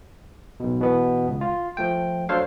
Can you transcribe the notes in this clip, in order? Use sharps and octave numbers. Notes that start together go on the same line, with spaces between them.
B1 B2
B2 E3 B3
C#2
F4
F3 A3 G5
F#3 D4 A4 C5 C#5 F5